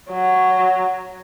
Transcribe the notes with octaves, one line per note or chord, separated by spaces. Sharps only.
F#3